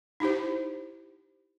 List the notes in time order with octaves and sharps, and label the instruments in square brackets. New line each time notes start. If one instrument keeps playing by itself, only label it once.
[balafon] D#4 E4 G4 C5